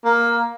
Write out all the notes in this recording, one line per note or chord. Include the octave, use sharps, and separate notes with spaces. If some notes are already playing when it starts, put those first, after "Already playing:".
A#3